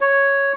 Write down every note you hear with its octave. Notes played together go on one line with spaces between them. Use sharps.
C#5